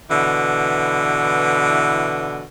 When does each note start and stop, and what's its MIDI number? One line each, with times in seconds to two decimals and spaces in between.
0.09 2.43 47
0.09 2.43 50
0.09 2.43 52